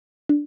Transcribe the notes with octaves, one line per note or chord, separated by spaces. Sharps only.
D4